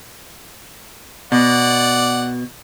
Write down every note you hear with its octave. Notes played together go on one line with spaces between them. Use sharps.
B2 D5 F#5